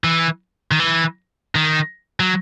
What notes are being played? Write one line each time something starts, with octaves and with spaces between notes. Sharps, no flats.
E3
D#3
E3
D#3
F#3